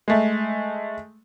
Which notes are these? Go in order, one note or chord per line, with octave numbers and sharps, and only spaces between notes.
G#3 A3